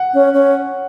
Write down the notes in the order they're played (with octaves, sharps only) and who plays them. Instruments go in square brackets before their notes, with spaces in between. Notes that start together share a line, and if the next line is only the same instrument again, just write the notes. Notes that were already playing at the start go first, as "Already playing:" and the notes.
Already playing: [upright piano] F#5
[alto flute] C#4
C#4